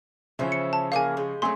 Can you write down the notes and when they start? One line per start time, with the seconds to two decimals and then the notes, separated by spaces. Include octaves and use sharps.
0.39 C#3 E3 F3 C#4 C5 E5
0.52 C#7
0.73 A5
0.92 E3 A#3 G#4 F5 G#5
1.17 G#3 G4
1.42 F#3 A3 C4 C#4 G#4 C6